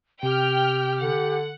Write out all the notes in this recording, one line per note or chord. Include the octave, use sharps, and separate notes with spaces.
C3 G4 G5 F6
D3 F#5